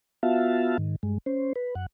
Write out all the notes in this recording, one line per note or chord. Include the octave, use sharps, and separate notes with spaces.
B3 F4 F#4 E5 F5 A5
G#2 D#3
G2 G#3
C#4 C5
B4
F#2 F#5